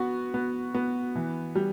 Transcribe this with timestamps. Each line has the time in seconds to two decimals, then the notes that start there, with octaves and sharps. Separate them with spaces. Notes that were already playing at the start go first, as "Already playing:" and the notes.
Already playing: B3 F#4
0.34 B3
0.74 B3
1.16 E3
1.55 G3